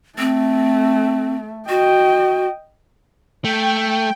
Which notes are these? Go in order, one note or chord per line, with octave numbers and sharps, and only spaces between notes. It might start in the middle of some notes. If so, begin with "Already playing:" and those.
A3 C4
F#4 D#5 G5
A3 G5